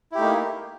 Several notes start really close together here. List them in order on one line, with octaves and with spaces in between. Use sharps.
E4 G4 A3 D#4 A#3